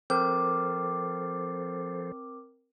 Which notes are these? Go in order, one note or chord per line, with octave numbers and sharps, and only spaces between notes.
F3 C4 A4 A#4 C5 D6